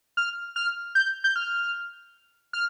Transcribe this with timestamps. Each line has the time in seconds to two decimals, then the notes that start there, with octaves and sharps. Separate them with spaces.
0.17 F6
0.56 F6
0.95 G6
1.24 G6
1.36 F6
2.53 F6